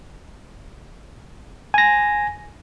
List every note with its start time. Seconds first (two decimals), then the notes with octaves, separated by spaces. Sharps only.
1.74 G#5 A#6